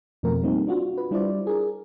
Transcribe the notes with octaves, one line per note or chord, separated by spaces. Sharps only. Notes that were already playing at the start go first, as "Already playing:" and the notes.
F2 B2 F3 A3 C4 A#4
G3 A#3 C4 D#4
D4 F4 F#4
B4
G3 D4 E4 F4 C5 D5
G#4 A#4